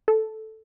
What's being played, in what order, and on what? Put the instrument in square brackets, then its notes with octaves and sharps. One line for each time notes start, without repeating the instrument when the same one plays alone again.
[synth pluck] A4